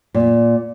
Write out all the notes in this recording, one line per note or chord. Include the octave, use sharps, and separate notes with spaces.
A#2